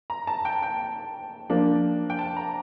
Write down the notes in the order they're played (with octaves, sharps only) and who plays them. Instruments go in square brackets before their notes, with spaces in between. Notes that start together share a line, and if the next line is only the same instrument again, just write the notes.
[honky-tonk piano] A#5
A5
G5
G5
[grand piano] F3 A#3 D4
[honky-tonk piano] G5
A5
A#5